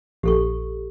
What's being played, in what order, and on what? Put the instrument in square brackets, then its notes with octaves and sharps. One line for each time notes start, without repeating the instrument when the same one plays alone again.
[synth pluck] A#1 [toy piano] G4 A4 C#6